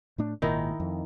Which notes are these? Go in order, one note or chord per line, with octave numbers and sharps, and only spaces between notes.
A2 A3 D4
G#1 A#2 D#3 D#4 E4
F2